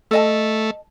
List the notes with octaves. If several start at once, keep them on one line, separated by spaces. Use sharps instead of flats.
A3 A4 D#5 A5